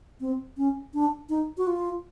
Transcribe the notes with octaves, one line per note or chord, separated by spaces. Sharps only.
C4
C#4
D4
D#4
F#4
F4